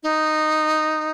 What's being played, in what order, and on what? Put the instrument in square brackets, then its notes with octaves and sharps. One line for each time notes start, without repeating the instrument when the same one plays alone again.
[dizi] D#4